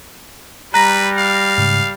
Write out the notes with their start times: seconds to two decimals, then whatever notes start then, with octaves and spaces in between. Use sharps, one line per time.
0.74 G3 B4 A#5 F#6 A#6
1.18 F5
1.58 G#2 C#3